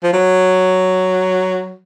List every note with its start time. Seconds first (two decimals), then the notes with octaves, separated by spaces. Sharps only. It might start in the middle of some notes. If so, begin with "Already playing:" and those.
0.04 F3
0.13 F#3